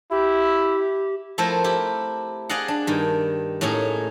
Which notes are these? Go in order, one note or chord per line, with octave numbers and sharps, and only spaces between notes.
E4 G4
F3 A3 C4 E4 A#4 C5
E4 G4
G#4 D5 D#5 F5 F#5
D4
G2 D#3
A2 A#3 C#4 D#4 G#4